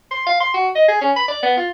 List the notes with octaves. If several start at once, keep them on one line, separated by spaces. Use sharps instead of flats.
C6
F5
C6
F#4
D#5
G#4
C#4
B5
D5
B3
F4